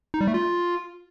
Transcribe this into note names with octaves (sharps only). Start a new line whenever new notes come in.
D#4
G3
A3
F4